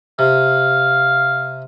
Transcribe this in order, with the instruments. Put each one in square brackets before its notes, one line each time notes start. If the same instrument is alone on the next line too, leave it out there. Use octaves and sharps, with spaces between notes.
[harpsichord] C3 [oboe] F5